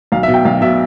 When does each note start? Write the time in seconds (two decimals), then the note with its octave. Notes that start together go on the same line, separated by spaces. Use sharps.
0.12 B1 F5
0.23 E5
0.28 B2
0.34 G5
0.45 B1 F5
0.61 B2 E5